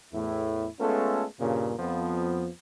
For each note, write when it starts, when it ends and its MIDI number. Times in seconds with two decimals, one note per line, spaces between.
0.13 0.67 40
0.13 0.67 45
0.13 0.67 64
0.80 1.24 56
0.80 1.24 57
0.80 1.24 59
0.80 1.24 61
0.80 1.24 65
0.80 1.24 69
1.40 1.74 43
1.40 1.74 46
1.40 1.74 49
1.79 2.49 41
1.79 2.49 53
1.79 2.49 59